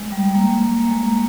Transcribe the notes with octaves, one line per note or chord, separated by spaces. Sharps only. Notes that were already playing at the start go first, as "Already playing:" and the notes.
Already playing: G#3
G3
G#3
A#3
A#3
G#3
A#3